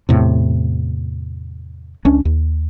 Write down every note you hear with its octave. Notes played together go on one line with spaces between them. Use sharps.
E2 A2 C3
C#2 C#4 D4
D#2